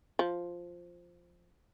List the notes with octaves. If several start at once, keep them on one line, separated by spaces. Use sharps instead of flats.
F3